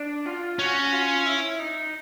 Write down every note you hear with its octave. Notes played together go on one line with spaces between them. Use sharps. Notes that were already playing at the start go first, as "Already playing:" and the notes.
Already playing: D4
F4
C#4 F#4
F4
E4
D#4